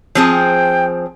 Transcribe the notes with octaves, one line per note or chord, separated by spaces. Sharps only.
F3 C4 G#4
G5